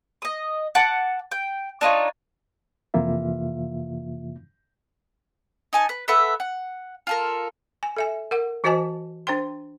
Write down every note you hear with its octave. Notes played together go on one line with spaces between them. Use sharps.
D#5 D#6
F#5 A5 D6
G5
D4 D#4 F4 C#5
F2 C3 E3 A#3 F4 E5
D#4 G#5 A5
B4
A4 B4 E5 F#5
F#5
F4 A4 A#4
G#5
A4 E5 G#5
A#4 F#5
E3 F#4 C5 D#5 G#5 A5
D4 C5 G5 C6